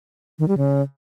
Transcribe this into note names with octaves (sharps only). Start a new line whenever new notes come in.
D#3
G3
C#3